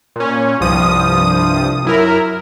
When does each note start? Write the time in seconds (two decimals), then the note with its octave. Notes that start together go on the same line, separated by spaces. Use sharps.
0.16 A#2 C#4
0.60 C2 G2 F3 D#6
1.85 F#2 E4 A#4